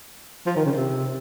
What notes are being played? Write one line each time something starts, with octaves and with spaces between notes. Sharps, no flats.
F3
D#3
C#3
C3